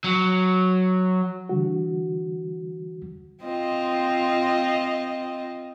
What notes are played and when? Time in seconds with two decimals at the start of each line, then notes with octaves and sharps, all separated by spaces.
0.04 F#3
1.49 D3 E3 G3 F#4
3.44 C4 F4 D#5